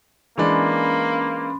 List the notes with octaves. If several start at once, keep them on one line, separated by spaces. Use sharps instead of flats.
E3 G#3 A#3 C#4 D4 B5 C6